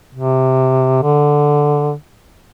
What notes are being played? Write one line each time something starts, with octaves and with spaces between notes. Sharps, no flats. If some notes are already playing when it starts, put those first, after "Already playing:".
C3
D3